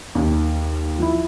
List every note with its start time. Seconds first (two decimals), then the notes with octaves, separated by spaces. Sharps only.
0.15 D#2
0.99 F3 E4